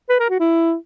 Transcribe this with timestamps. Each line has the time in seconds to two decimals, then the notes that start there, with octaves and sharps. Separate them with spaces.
0.09 B4
0.19 A#4
0.30 F#4
0.40 E4